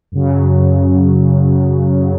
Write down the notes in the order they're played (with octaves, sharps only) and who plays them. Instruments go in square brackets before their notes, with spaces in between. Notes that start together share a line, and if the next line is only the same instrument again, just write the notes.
[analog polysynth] F#2 C#3 F#3